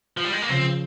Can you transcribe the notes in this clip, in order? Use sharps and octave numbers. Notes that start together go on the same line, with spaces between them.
F3
G3
G#3
A#3
C#3 F3 C4